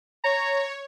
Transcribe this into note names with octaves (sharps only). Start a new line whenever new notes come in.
C#5 A#5